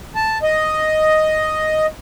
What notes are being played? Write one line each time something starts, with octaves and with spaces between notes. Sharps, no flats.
A5
D#5